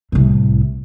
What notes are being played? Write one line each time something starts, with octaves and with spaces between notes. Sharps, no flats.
C2 A2